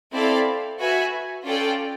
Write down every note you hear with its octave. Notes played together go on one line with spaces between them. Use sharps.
C4 E4 A4 D5 F5
F#4 B4 E5 G#5
C#4 F4 A4 D5 G5